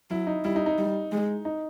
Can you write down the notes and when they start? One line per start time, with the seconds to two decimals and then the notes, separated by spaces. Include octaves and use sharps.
0.10 F#3 E4
0.27 D#4
0.44 G3 E4
0.56 D#4
0.66 D#4
0.78 G3
1.12 G#3
1.45 D#4